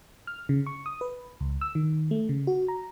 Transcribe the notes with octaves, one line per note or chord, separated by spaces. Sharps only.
F6
C#3
C#6
D#6
B4
C#2
E6
D#3
A3
C#3
F#4
A#5